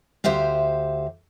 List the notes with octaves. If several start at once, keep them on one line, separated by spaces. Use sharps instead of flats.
D2 G4 C5 E5 F5